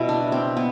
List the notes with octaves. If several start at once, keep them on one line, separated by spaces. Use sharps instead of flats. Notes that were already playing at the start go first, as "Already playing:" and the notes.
Already playing: B2 G3 B3 E4
D4
C4
B3